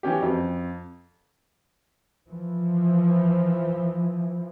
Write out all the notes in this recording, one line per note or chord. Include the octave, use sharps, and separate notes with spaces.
E3 F#3 C#4 G4
F2
E3 F3